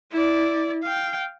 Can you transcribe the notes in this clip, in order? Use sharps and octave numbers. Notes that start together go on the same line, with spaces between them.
E4 D5
F5 G5